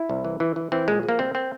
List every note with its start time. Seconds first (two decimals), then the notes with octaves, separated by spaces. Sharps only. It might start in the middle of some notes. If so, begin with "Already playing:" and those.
Already playing: E4
0.09 C2
0.25 E3
0.40 E3
0.56 E3
0.72 E3 C4
0.88 A#2 G#3
1.03 F3
1.09 A#3
1.19 C2 C4
1.35 C4